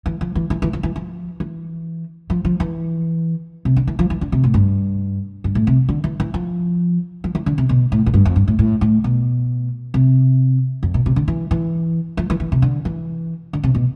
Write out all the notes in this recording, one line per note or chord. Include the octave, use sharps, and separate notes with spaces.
E3
F3
E3
E3
E3
F3
E3
F3
E3
F3
F3
E3
C3
D3
E3
F3
E3
D3
C3
A2
G2
G2
A2
C3
D3
E3
E3
F3
F3
E3
D3
C3
B2
A2
A2
G2
F2
G2
A2
A2
A2
B2
C3
F2
B2
C3
D3
E3
E3
F3
E3
E3
C3
D3
E3
D3
C3
B2